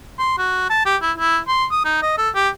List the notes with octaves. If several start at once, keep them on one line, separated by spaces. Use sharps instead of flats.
C6
F#4
A5
G4
E4
E4
C6
D#6
D#4
D#5
A4
G4